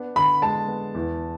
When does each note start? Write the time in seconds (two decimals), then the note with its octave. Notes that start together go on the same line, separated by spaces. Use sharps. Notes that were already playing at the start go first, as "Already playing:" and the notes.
Already playing: B3 D4
0.16 D3 B5
0.42 G#3 A5
0.68 B3
0.95 E2